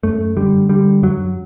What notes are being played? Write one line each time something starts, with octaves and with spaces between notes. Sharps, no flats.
F#2 A3
D3 G3
D3 G3
F#2 F#3